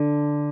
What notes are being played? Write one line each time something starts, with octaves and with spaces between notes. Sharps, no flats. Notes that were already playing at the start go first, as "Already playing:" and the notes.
Already playing: D3